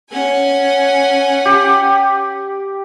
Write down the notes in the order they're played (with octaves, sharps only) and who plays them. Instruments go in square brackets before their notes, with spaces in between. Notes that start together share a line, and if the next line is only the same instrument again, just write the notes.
[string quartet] C#4 F#5 G#5
[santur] G4